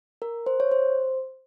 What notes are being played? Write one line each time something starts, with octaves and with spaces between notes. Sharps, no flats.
A#4
C5
C#5
C5